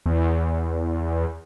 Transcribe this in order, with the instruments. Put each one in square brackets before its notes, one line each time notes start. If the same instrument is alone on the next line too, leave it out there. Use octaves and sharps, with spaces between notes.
[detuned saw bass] E2